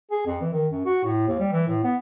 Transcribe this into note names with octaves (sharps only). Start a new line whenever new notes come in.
G#4
F2
E3
D#3
F#2
F#4
A2
D#2
G3
E3
A2
B3